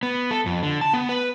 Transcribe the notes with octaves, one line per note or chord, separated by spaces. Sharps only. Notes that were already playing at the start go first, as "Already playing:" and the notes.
B3
A4
F2
D3
A5
B3
B4